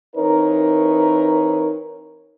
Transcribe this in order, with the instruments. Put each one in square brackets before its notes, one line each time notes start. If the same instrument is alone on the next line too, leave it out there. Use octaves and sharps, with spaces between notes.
[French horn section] E3 C4 D#4 A#4 B4 C#5